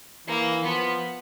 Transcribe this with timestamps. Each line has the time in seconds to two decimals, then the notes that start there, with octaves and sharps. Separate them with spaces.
0.27 E3 A#3
0.64 F3 B3